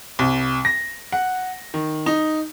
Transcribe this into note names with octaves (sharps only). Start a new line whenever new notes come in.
C2
A#6
F#5
D#3
D#4